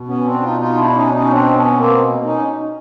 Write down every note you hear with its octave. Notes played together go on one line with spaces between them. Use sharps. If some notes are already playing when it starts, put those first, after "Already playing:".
Already playing: B2
B3 C#4
C4 D4
D#4 F4
D#4 F4
D4 E4
D4
C#4 D#4
D4
C#4 D#4
C4 D4
B3 C#4
A#3 C4
C#4 D#4